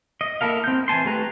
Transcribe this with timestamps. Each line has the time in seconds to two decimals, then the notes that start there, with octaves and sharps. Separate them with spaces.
0.21 D#5
0.41 A#3 E4 A4 A#4 F5
0.64 C4 G6
0.88 E3 G#5 A5 C6
1.05 A3 G4 B4 A#5 F#6